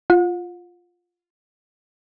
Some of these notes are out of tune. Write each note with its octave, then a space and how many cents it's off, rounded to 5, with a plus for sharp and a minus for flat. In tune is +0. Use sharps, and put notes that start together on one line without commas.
F4 +0 F#5 -40